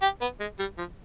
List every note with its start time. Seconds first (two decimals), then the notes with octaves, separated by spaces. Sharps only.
0.02 G4
0.21 B3
0.40 G#3
0.59 G3
0.78 F3